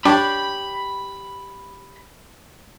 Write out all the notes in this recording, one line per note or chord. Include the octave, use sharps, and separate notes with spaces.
D4 G4 C#5 B5